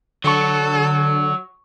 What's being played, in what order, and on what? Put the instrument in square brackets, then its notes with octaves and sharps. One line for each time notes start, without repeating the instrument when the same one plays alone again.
[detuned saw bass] D3 [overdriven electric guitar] F#3 [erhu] A4 [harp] C#6 C#7